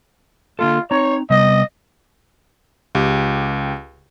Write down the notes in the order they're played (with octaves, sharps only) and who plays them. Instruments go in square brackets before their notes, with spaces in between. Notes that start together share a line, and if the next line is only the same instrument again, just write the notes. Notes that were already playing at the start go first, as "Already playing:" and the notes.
[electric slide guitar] D3 A#3 A4 [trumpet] F4
[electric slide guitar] C4 D#4 A#5 [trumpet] C#5
[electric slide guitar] C3 G3 B3 [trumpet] D#5
[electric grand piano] C#2 G4